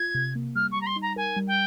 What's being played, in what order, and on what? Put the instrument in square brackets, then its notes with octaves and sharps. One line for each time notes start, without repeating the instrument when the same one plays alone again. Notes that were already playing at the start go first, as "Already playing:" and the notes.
Already playing: [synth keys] F4 [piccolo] G#6
[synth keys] C3
A#3
[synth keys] G3 [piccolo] F6
[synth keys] G3 [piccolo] C#6
[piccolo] A#5
C6
[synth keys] D#4
[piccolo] A#5
[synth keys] A#4 [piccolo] G#5
[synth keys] G3
[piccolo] G5